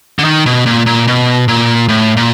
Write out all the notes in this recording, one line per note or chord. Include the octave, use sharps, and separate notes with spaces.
D3
D#3
B2
A#2
A#2
B2
A#2
A2
A#2